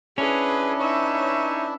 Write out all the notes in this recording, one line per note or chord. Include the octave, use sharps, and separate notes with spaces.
C#4 D4 E4 G#4 B4
D#4 B4 C#5 E5